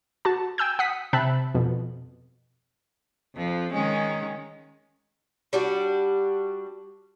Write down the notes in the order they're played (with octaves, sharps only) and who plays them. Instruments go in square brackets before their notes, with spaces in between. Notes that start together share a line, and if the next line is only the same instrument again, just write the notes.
[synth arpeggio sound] F#4 A5
G5 G#5 E6 G6
F#5 D#6 B6
C3 C4 E5 A5 B5 F#6
F2 B2
[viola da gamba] F2 F3
D#3 G#3 C#4
[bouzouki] G3 D4 F#4